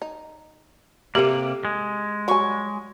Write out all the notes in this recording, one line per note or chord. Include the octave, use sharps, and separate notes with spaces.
D#4
C3 A#3 G4 A4 A#4 E5
G#3
F#3 G3 G#5 B5 C#6